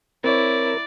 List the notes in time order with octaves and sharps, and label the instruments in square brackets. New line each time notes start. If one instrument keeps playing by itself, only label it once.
[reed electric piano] C4 C#5 [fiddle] E4 [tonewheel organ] A#4 [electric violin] D5